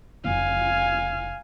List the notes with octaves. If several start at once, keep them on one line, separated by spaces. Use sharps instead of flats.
F1 C#3 F5 G#5